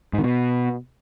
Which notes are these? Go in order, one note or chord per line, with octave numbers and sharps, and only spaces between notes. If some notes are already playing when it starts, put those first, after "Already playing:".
G#2
D#3
B2